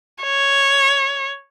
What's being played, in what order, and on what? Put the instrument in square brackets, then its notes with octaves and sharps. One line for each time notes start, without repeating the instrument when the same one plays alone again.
[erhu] C#5